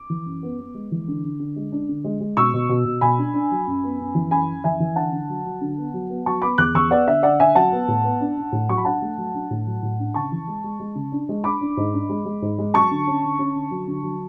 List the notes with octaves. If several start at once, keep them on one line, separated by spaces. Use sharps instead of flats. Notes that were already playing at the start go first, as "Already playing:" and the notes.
Already playing: D6
E3
F#2
B3
B3
G#3
E3
D3
D3
D3
G#3
D4
D3
G#3
G#3
B2 C#6 E6
B2
B2
B2
B2 G#5 B5
D4
D4
F#3
F#2
B3
F#2
E3
F#2 G#5 B5
F#2
E3 E5 G#5
E3
D3 F#5 A5
D3
F#3
F#3
D3
B3
F#3
B3
F#3 A5 C#6
B3 B5 D6
E2 D6 F#6
E2 C#6 E6
B3 D5 F#5
D3 E5
D3 D5 F#5
D3 E5 G#5
F#3 F#5 A5
B3
A2
B3
D4
D4
A2
F#3 C#6
B5
D4 F#5 A5
A3
F#3
D4
A2
F#3
A2
D4
C#3 A5 C#6
E3
G#3
G#3
G#3
C#3
D4
G#3
D4 B5 D6
D4
G#2
D4
G#3
G#3
G#2
G#3
F#3 A5 C#6
D3
C#4
D3
C#4
D3
F#3
D3
F#3